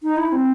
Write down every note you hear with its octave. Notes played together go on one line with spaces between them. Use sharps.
D#4
E4
C4